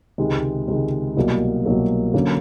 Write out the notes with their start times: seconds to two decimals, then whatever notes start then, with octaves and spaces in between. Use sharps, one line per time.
0.18 C#2 C3 D#3 G#3
0.68 C#2 C3 D#3 G#3
1.17 C2 B2 F#3 A#3
1.66 C2 B2 F#3 A#3
2.14 D3 F#3 A#3 C#4